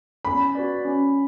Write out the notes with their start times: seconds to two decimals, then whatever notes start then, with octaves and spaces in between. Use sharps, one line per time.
0.25 C#4 B5
0.55 F#4 B4 D5
0.85 C#4